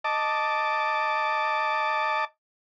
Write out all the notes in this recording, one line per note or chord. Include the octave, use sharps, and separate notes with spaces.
D#5 A5 D6